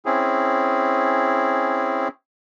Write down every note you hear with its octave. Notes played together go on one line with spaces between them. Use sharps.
C4 C#4 E4 G#4